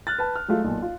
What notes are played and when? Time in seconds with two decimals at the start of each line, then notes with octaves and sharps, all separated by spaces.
0.07 F6 F#6 A6
0.18 B4 A5
0.36 F6
0.48 F#3 G#3 A3 F4
0.64 B1 A#2
0.82 F4